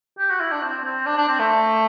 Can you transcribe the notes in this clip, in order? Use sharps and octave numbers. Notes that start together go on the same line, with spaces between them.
G4
F#4
E4
D4
C4
C4
D4
D4
C4
A3